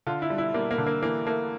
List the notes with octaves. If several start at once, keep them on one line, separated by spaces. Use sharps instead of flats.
D3 F4
E4
G3
E4
G3 A#3
A#3
D3
A#3
E3 A#3
A3 A#3